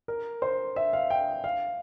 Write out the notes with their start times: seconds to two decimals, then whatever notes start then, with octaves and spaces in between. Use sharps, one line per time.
0.08 A#4
0.42 C5
0.76 E5
0.93 F5
1.10 G5
1.44 F5